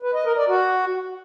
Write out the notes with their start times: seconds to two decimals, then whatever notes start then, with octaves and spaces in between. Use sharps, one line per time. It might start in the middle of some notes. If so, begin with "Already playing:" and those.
0.02 B4
0.14 D#5
0.26 A#4
0.37 D5
0.49 F#4